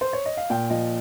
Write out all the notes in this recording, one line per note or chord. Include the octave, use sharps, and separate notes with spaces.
C5
C#5
D#5
F5
A#2 G5
F3 D#5